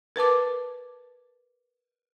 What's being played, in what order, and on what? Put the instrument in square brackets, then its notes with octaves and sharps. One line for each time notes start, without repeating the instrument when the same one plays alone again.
[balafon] A#4 B4 A5 D6